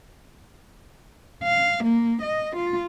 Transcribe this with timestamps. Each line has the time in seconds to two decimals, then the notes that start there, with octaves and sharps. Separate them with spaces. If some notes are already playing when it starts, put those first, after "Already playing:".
1.44 F5
1.84 A#3
2.22 D#5
2.56 F4